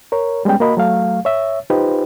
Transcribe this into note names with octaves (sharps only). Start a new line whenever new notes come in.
A#4 C#5
G3 G#3 B3 C#4 G5
A#3 F#4 A#4 D#5 B5
F#3 A3 F5
C#5 E5
D#4 F4 G4 B4 C5